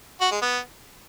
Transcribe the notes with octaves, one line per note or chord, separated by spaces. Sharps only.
F#4
G#3
B3